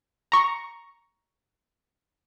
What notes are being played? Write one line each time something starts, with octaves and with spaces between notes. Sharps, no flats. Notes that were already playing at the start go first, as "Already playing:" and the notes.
A#5 C#6